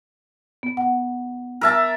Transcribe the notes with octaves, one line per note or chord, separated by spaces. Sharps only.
B3
F#5
A#4 E5 A5